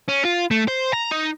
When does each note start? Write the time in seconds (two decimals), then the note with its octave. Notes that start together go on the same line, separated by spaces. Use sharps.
0.09 C#4
0.25 F4
0.51 A3
0.68 C5
0.93 A#5
1.11 D#4